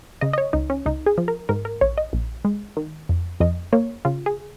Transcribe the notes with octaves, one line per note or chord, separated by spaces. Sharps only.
C#3 D#5
D#5
C#5
C#2 D#4
C#4
C#2 D#4
G#4
F3
A#4
G#2 A#4
A#4
A#1 C#5
D#5
A#1
G#3
D#3
F2
F2 D#5
A#3 C#5
C#3 F4
G#4